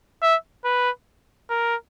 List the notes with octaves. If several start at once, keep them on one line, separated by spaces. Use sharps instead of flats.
E5
B4
A#4